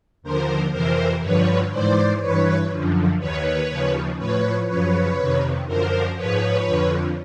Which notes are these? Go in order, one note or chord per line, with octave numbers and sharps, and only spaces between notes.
D#2 D3 F3 A#4 C5
F2 C3 E3 A#4 C5
G2 D3 F3 B4 C#5
G#2 E3 C5 D5
G2 E3 B4 C#5
F#2 D3 F3
D#2 D#3 B4 C#5
D#2 C#3 F3
A2 F3 B4 C#5
F#2 C#3 F3 B4 C#5
F2 C3 D#3
F#2 D3 F3 A#4 C5
G#2 F3 B4 C#5
F2 D3 F3